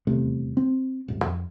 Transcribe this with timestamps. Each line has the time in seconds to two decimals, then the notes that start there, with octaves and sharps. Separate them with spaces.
0.07 D#1 E2 C3 A3
0.57 C4
1.08 D#1 G#1
1.25 F2